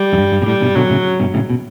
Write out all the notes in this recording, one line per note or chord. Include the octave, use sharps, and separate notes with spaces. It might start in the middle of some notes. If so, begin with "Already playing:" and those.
Already playing: G3
F#2
G2
G2
B2
A2 G3
G2 B2
B2 D3 F#3
A2 C#3
G2 B2
A2 C#3
B2